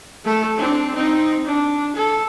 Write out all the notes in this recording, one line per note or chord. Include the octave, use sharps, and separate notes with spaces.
A3 A4
C4 D4
C4 D#4
D4
A4